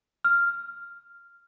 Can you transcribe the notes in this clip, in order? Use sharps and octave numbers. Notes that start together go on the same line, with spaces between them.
F6